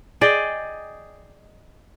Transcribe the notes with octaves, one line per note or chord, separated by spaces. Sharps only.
G#4 D5 D#5 G5